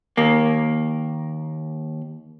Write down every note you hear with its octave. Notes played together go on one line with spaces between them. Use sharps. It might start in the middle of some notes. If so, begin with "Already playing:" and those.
D#2 A#3